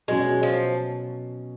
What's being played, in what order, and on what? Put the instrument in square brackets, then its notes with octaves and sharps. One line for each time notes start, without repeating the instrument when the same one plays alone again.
[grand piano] B2 F#3 C#4 [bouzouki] G#3
[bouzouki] F3